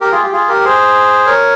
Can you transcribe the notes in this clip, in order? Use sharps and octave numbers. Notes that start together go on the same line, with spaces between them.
G4 A#4
F4 G#4
G4
F4 G#4
G4 A#4
G#4 C5
A#4 C#5